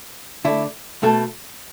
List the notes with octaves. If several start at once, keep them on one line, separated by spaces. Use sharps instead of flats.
D3 A3 E4
B2 A3 A4